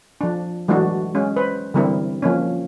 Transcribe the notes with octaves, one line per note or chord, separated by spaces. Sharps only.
F3 D4
E3 F#3 G#3 A3 D4 F#4
G#3 C#4
B4 C5
D3 E3 G3 C4 E4 A#4
F3 A#3 C#4